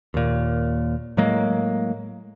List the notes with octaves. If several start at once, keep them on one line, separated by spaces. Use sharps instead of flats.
D#2 A#2
A2 F#3 G#3 A#3